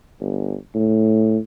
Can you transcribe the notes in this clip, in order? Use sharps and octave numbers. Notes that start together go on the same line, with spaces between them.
G1
A2